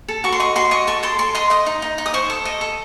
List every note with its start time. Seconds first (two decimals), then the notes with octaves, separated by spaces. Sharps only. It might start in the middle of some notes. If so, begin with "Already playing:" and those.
0.08 A4
0.24 F#4 C#6
0.32 C6
0.39 D#5 C#6
0.56 F#4 C6
0.71 D#5 C#6
0.87 A4 C#6
1.03 A4 C6
1.19 A4 C6
1.35 D#5 C6
1.50 D#5 D#6
1.66 D#4
1.82 D#4
1.98 D#4
2.06 D#6
2.14 C5 C#6
2.30 A4
2.45 D#5
2.61 A4